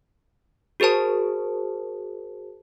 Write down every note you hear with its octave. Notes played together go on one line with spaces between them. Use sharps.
F#4 G#4 A#4 C5 A5